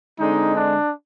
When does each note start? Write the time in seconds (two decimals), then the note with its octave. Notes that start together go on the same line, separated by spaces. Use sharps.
0.18 D3 G#3 C4 D#4
0.54 D4